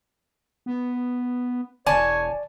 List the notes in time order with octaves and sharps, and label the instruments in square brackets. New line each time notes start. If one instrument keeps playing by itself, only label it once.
[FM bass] B3
[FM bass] E1 [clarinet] C#5 [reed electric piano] D5 [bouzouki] G#5 A5